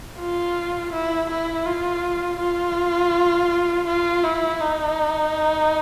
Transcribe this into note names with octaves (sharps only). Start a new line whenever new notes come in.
F4
E4
E4
F4
F4
F4
E4
D#4